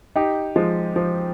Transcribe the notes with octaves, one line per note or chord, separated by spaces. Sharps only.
D#4 G4
F3 G#3
F3